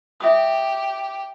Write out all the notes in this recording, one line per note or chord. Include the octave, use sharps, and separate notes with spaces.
G4 E5 D#6